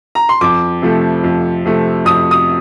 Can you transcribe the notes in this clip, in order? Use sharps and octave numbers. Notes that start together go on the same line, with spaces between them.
A#5
C6
F2 D6
C3 F3 A3
F2
C3 F3 A3
F2 D#6
D#6